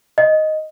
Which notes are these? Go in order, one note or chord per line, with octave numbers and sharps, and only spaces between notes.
D#5